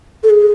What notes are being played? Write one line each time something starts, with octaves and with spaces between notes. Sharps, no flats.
A4
G#4